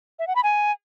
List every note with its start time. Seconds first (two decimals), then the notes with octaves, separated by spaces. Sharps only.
0.19 E5
0.27 F#5
0.35 B5
0.44 G#5